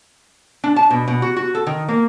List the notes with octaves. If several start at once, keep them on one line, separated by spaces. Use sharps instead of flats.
D4
A5
B2
B2
F#4
F#4
A4
D#3
A#3